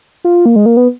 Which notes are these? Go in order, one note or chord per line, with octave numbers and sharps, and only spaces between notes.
F4
A#3
G#3
A#3
B3